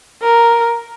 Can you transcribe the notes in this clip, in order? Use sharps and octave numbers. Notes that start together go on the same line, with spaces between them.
A#4